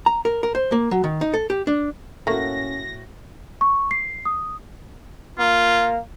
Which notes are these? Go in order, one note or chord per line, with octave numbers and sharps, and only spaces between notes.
A#5
A#4
A#4
C5
A#3
F#3
D#3
D#4
A4
G4
D4
A2 A3 A#3 C#4 F#4 A#6
C#6
C7
D#6
A#3 F4